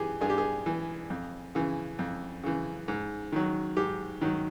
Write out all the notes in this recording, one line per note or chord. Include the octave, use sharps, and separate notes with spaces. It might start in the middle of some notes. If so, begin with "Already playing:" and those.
Already playing: E3 G4 G#4
G2 G#4
G4
G#4
E3
F2
C#3 E3
F2
C#3 E3
G#2
D#3 F#3
G#2 G4
D#3 F#3